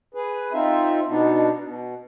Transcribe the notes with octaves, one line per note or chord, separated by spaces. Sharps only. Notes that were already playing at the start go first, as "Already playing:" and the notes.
G#4 B4
C4 D#4 F4 E5
B2 B3 D4 D#4
B2